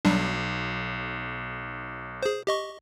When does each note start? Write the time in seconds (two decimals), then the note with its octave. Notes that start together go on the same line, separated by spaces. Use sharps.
0.05 B1 F#3 G3 D4
2.23 G#4 C5
2.47 G4 D#5 C#6